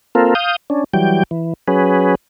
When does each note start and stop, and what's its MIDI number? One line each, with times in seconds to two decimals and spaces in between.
0.15 0.34 58
0.15 0.34 60
0.15 0.34 65
0.15 0.34 69
0.15 0.34 70
0.35 0.56 77
0.35 0.56 87
0.35 0.56 91
0.70 0.84 61
0.70 0.84 62
0.94 1.23 52
0.94 1.23 54
0.94 1.23 55
0.94 1.23 79
1.31 1.54 52
1.68 2.15 54
1.68 2.15 61
1.68 2.15 68
1.68 2.15 71